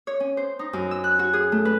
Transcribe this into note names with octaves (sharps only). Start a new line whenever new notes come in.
C#5
C#4
C5
D#4
F#2
E6
F#6
F#4
G#4
A3
B4